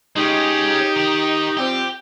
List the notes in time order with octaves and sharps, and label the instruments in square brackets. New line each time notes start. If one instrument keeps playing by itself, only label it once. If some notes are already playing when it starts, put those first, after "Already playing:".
[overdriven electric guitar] G#3 C#4 [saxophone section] D#4 [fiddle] G4
[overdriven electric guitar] D#3
[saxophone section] F3 G3 C4 [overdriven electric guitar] G4